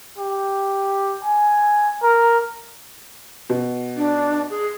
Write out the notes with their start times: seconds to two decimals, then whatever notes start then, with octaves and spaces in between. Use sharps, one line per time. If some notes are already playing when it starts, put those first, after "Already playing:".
0.18 G4
1.25 G#5
2.03 A#4
3.50 B2
3.97 D4
4.50 G#4